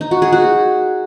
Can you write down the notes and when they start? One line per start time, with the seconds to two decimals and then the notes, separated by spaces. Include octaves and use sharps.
0.01 D#4
0.11 F#4
0.22 G#4
0.33 F#4